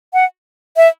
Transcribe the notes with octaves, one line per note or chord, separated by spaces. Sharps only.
F#5
E5